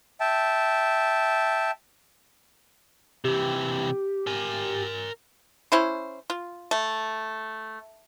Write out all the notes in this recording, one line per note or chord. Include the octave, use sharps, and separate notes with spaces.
E5 G5 A5
C3 E3 G4
A#4 G#5
C#4 E4 C5
F4
A3